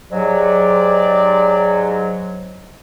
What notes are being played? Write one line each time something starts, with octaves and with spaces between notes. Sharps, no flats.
G#2 F#3 G4 D5